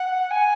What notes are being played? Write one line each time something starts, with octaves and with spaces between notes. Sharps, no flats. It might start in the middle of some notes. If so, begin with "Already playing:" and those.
Already playing: F#5
G#5